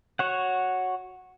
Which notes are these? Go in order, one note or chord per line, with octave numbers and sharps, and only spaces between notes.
F#4 C#5 F#5